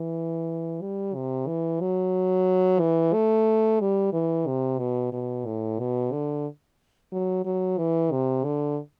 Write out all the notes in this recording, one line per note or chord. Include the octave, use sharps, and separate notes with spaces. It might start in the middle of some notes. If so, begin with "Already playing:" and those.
Already playing: E3
G3
C3
E3
F#3
E3
A3
G3
E3
C3
B2
B2
A2
B2
D3
F#3
F#3
E3
C3
D3